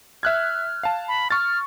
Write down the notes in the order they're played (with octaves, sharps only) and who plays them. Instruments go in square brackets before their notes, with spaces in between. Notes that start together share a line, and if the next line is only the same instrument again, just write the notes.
[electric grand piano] E5 F#6 G#6 [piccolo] F6
[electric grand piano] F5 A5
[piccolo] B5
[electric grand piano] C#6 A6 [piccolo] F6